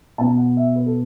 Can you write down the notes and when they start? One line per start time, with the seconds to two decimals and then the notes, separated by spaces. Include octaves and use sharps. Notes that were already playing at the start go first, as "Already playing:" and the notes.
0.18 B2 B3 A5
0.37 F#5
0.57 E5
0.76 B4
0.86 A4